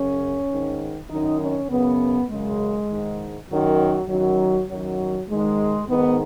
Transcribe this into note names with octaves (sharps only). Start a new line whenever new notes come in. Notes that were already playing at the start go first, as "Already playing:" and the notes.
Already playing: F#2 C#3 C#4
G#2 D#3
F#2 D#3 D#4
C#4
F#2 C#3 B3
F#2 C#3 G#3
G#2 D#3
F#2 D#3 F#3
F#2 D#3 F#3
F#2 D#3 F#3
G#2 D#3 G#3
G#2 D#3 B3